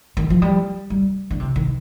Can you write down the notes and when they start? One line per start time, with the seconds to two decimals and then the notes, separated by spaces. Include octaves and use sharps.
0.17 D#3
0.30 F3
0.42 G3
0.90 G3
1.30 D3
1.40 C3
1.56 D#3